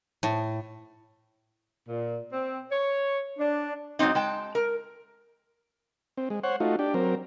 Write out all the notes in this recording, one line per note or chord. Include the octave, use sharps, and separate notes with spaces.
A2
A#2
C4
C#5
D4
G#2 F3 F#3 C4 D#4
G#3 G5 A5
A#4
C4
G#3
C5 C#5 F#5
A3 D#4 F4 F#4
D4 G4
F#3 C4 A#4